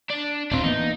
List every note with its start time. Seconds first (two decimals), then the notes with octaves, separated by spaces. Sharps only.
0.10 D4
0.52 D1 C4 D4 F4
0.64 E3 A#3 B3 D#4